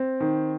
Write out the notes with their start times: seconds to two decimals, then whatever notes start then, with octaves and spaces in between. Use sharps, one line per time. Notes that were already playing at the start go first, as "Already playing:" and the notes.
Already playing: C4
0.20 D#3